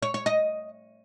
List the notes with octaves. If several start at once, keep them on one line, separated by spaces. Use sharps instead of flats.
C#5
C#5
D#5